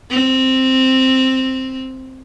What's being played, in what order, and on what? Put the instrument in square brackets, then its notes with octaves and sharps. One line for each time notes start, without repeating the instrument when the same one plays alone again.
[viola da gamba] C4